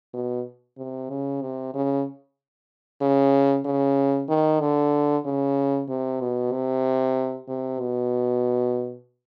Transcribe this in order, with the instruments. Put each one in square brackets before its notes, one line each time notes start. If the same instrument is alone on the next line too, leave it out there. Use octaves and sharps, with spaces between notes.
[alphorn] B2
C3
C#3
C3
C#3
C#3
C#3
D#3
D3
C#3
C3
B2
C3
C3
B2